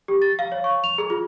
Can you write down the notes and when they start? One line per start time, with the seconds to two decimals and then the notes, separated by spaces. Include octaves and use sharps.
0.08 G4
0.22 A6
0.39 F5
0.52 C#5
0.64 C#6
0.84 F7
0.98 G#4
1.10 F4